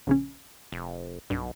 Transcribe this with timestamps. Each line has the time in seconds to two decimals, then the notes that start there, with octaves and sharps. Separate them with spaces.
0.07 A#1 C#3 C#4
0.72 F1
1.30 B1 G2